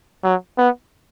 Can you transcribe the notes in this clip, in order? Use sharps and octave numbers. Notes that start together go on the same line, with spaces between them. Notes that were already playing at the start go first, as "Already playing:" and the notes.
F#3
B3